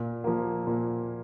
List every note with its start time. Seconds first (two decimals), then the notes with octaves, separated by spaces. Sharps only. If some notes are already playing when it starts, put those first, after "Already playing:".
Already playing: A#2
0.24 F3 A#3
0.67 A#2